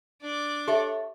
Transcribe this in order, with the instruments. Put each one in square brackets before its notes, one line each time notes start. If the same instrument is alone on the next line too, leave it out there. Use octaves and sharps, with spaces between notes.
[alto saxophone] D4 [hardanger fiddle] D5 D6
[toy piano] G4 E5 [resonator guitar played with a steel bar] A4 C#5